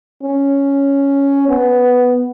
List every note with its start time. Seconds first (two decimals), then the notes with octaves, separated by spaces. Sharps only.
0.23 C#4
1.49 B3